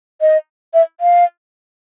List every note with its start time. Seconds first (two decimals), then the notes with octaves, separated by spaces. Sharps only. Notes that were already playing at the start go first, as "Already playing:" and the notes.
0.21 D#5
0.74 E5
1.01 F5